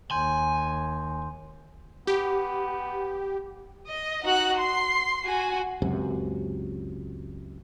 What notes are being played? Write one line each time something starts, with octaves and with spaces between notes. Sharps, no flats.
D#2 G#5 C6 G6
B3 G4
D#5
D#4 F#4 F#5 F#6
C6 C7
F#4 G#5
C#2 F#2 C3